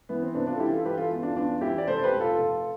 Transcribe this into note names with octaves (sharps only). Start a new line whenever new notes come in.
E3 B3
C4
C3 B3 D4
D4 F4
A4
E3 E4 G4
F4 A4
E3 G4 B4
F4 A4
E2
D4 F4
E2 D4 F4
E3 E4 G4
D5
F1 A4 C5
G4 B4
F1
F4 A4
F1